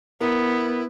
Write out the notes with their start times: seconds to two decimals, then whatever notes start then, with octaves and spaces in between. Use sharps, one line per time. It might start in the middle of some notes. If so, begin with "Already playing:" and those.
0.21 B3 E4 A#4